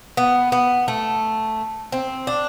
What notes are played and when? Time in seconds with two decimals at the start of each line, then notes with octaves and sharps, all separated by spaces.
0.17 B3
0.52 B3
0.88 A3
1.92 C4
2.27 D4